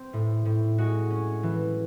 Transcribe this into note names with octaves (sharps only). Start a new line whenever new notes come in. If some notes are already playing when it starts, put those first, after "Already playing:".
Already playing: C4
A2
A2
G#3 F#4
C#4
E3